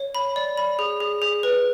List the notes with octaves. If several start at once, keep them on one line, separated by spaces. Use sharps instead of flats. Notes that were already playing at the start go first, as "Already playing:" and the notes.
Already playing: C#5
B5
D5
B5
G#4
G#4
G#4
B4